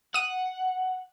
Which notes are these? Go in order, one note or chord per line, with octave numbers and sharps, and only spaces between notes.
F#5 D#6 D#7